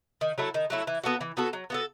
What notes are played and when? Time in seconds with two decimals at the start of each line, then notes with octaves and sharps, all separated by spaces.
0.21 D#3
0.38 F#3 A3 E4
0.54 D#3
0.70 F#3 A3 E4
0.87 E3
1.04 B3 F#4 A4
1.21 E3
1.37 B3 F#4 A4
1.53 F#3
1.70 B3 F#4 A4